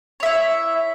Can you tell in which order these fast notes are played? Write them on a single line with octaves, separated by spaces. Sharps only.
C#5 E5 E4